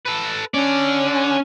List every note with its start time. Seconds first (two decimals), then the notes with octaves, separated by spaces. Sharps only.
0.06 A4 B4
0.54 D3 C#4 D5